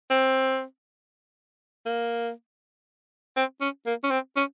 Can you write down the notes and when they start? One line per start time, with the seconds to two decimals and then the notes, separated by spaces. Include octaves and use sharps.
0.10 C4
1.86 A#3
3.36 C4
3.61 C#4
3.86 A#3
4.04 C#4
4.11 C4
4.36 C#4